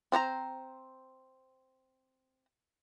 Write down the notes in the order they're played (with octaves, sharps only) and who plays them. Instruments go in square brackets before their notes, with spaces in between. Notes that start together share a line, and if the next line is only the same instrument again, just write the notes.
[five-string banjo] C4 D4 C5 A#5